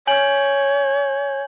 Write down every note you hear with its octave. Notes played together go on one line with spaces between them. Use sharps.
C#5 G#5 G6 F#7